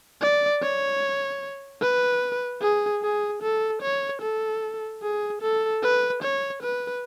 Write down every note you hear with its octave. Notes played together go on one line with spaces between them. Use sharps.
D5
C#5
B4
G#4
G#4
A4
C#5
A4
G#4
A4
B4
C#5
B4